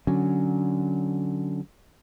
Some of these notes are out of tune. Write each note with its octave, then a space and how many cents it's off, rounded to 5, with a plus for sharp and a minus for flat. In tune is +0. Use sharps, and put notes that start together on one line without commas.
D3 +0 F#3 +0 C#4 +0